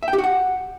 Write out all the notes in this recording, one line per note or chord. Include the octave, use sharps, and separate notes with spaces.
E5
G5
G4
F#4
F#5